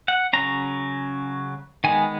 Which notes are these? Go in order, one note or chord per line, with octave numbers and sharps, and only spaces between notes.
F#5
C#3 F#3 C#4 A#5
D#3 G#3 B3 G#5